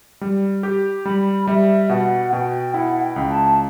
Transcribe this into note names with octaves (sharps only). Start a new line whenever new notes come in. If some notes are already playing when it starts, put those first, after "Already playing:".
G3
G4
G3 B5
G3 E5
B2 F#5
B2 G5
E4 F#5
G5
C#2
A5